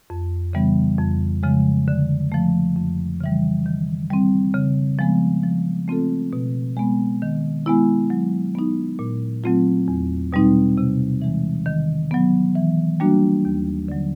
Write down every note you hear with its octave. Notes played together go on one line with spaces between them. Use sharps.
F2
C#3 E3 G3 B3
F2
C#3 F3 G#3
D3
F3 A3
F2
C#3 E3 G3
D#3
G3 C4
C#3
F3 G#3 B3
F3
A3 C4 F4 A4
B2
G#3 B3
D#3
G#3 B3 E4
F#3
B3 D#4
A#2
F#3 A3 C4 F4
E2
B2 G3 C4 D#4
C3
E3 G#3
D#3
F#3 B3
E3
G3 A#3 D4 F#4
D#2
D3 F#3